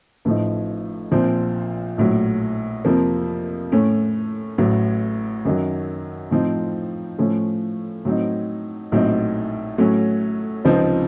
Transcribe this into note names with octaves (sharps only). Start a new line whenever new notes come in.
A1 A2 F3 A3 D#4
A#1 A#2 F3 C4
A#1 A2 F#3
F2 C3 F3 A#3
A2 A3 C#4
A1 A2 F#3
F#2 D#3 F#3
A2 F3 C4 D#4
A2 F3 A3 C#4
A2 F#3 C4 D#4
A#1 A2 F#3 C4 D#4
A2 F#3 A3 C#4
C#2 C3 F3 C4 D#4